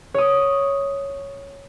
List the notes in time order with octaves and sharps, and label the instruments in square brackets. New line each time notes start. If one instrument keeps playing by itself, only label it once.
[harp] C#5 D#6